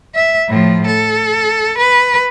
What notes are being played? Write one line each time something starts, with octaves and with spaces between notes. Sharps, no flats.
E5
A2 F3
A4
B4